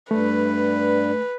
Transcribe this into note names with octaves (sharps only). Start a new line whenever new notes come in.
G2 G3 A3 B4